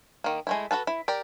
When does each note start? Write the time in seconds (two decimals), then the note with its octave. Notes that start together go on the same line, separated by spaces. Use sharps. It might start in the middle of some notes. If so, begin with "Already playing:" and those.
0.24 D#3 A#3
0.47 G#3 A3 E4
0.71 F#4 A4 B4 A5
0.87 E4
1.08 G4 A#4 D5